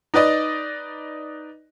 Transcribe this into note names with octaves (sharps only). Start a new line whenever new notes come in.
D#4 B4 D5 D#5